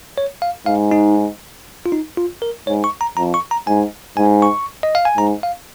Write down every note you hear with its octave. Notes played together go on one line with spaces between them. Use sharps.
C#5
F5
G#2 F5
D#4
F4
D#4
F4
A#4
G#2 C#5
C#6
A#5
F2 A#5
C#6
A#5
G#2 G#5
G#2 G#5
C#6
D#5
F5
G#5
G#2 A#5
F5